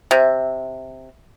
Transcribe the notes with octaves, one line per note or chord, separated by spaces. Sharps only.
C3